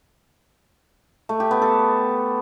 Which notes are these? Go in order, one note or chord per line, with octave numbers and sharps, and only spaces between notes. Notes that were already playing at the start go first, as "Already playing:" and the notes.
A3
G4
B3
A4